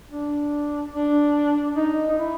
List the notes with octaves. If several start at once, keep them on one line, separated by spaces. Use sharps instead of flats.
D4
D4
D#4
D#4
E4